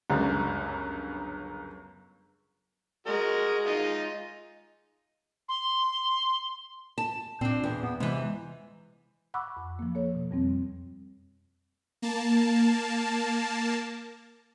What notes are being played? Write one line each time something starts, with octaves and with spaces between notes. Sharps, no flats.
G1 C#2 F#2
G#3 F#4 A#4
D#4 F4 D#5
C6
A5
A#2 C4 D4
E2
B3
C3 E3 G#3
F#5 B5 C#6 D6 E6 F#6
F2
F3 A#3
A#3 A4 C#5
B2
F2 G3 C4
A#3 A5